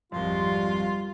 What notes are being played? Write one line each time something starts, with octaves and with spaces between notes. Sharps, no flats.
G#1 F2 G3 F4 C6